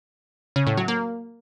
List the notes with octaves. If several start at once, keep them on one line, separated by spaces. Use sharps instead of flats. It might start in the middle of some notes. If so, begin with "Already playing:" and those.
C#3
A2
F#3
A#3